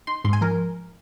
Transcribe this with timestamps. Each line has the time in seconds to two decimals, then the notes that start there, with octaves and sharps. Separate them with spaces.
0.07 D#4 C6
0.24 G#2 C6
0.33 G#5
0.41 F3 A#4